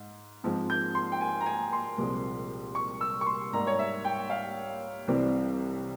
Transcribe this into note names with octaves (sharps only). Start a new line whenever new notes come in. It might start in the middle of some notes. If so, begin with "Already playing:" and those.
Already playing: G#2
G#2 F3 G#3 C4
G6
C6
G5
G#5
A#5
G#5
C6
C2 A#2 F3 G#3 C4
C#6
E6
C#6
C6
G#2 G3 A#3 A#5
C#5
E5
G5
F5
C2 C3 E3 G3 C4